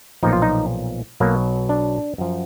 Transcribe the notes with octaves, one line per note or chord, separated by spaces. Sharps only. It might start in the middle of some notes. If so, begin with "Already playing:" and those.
B1 A#2 F3 D#4
F4
D#4
B1 B2 F#3 A#3
D4
F#2 F3